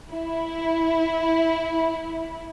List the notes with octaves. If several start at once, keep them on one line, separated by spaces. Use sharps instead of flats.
E4